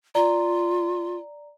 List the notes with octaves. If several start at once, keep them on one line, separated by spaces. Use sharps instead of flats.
F4 D5 A#5